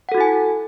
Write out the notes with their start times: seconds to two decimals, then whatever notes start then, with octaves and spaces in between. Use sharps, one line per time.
0.09 F#5
0.12 A4
0.15 F#4
0.18 E4
0.21 G#5